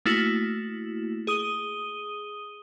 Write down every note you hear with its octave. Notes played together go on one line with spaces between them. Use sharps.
A3 A#3 E4 F#4
G#4 D#6 D#7 G7